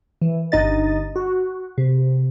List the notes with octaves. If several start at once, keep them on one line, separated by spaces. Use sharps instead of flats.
E3
G1 G2 D#4 D#5 A6
F#4
C3